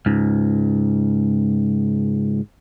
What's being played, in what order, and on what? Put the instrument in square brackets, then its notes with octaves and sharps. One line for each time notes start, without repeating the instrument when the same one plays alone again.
[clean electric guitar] C#2 G#2